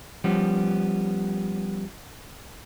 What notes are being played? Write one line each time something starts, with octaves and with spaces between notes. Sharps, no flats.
F3 G3 B3 C#4